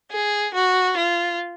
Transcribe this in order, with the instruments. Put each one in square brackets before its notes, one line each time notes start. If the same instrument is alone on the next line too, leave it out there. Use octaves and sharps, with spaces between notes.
[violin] G#4
F#4
F4